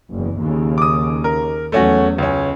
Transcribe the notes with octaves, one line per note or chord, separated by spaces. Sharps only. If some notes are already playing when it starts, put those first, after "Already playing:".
F#1 E2
D#2 C#3
D6 D#6
A#4
E2 F#3 A3 C#4 F#4
C#2 C#4